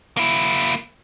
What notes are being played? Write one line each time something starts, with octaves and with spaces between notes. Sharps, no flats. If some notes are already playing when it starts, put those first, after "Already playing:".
A#3 E4